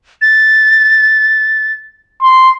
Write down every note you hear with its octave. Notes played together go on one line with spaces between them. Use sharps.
A6
C6